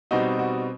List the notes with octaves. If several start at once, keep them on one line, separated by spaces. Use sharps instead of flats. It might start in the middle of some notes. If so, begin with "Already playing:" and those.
B2 G3 C4 D#4 F#4
F#4